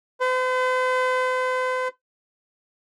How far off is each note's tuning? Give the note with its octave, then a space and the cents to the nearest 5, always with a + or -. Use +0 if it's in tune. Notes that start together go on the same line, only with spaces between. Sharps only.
C5 -45